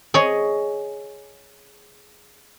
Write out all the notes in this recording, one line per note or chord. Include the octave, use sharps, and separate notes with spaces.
G#4 C#5 D#5